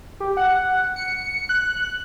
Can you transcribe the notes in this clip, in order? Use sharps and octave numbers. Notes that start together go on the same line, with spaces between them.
G4
F#5
C#7
F#6